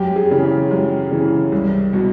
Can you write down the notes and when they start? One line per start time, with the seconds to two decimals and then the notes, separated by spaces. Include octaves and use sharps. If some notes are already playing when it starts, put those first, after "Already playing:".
Already playing: F#2 G4
0.16 G#4
0.31 C#3 E3
0.44 G4
0.71 F#2
1.11 C#3 E3
1.52 C2
1.93 B2